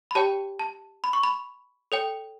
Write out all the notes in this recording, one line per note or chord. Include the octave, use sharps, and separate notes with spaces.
B5
G4 C#5 G5 A5
A5
B5
C#6
B5
A4 C#5 G5